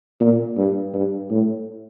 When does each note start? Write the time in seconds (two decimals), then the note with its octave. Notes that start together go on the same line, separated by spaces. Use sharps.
0.20 A#2
0.57 G2
0.93 G2
1.30 A2